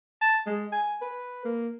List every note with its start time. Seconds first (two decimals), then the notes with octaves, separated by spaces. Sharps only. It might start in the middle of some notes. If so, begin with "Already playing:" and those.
0.22 A5
0.47 G#3
0.73 G#5
1.02 B4
1.45 A#3